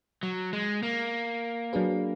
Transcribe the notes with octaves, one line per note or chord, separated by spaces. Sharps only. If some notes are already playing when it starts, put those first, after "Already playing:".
F#3
G#3
A#3
F#3 D4 G#4 B4